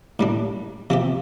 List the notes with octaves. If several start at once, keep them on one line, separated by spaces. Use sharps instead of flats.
A2 G3 D4
C3 F3 C4 G4